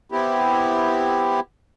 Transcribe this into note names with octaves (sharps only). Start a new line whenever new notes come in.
B3 C4 E4 G4